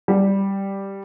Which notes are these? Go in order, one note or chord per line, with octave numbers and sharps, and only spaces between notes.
G3